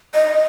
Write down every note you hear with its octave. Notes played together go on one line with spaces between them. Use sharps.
D#5